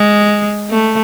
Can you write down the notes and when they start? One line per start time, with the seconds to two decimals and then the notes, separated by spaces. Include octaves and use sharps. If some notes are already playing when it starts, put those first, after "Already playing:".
Already playing: G#3
0.70 A3